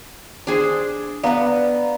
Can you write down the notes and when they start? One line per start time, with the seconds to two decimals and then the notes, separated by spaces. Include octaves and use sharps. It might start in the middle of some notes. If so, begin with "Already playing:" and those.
0.47 D4 G#4 C5
1.24 B3 B4 D5 F5 A#5